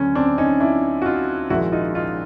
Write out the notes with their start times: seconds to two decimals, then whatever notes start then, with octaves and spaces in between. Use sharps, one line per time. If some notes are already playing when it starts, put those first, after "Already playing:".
Already playing: D2 D3 F#3 C#4
0.15 C4 D4
0.38 C#4 D#4
0.60 D4 E4
1.02 F#4
1.06 D#4 F4
1.50 A#1 G#2 D#3 G#3 E4 F#4
1.72 D#4 F4
1.95 D#4 F4